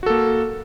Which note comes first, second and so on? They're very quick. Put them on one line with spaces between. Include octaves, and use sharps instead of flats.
F#4 A4 A#3